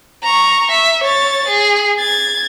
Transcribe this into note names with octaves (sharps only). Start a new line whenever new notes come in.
A#5 C#6
E5
C#5 A6
G#4
G#6 A6